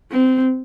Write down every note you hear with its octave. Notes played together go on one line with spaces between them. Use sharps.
C4